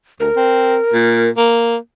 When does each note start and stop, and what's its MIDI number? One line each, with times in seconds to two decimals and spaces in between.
0.20 0.30 38
0.20 1.30 70
0.36 0.77 60
0.93 1.29 46
1.37 1.76 58